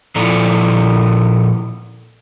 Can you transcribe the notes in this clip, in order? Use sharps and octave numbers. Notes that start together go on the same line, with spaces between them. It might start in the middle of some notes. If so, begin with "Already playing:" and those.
A#2 F3 E4 A4 D5 A#5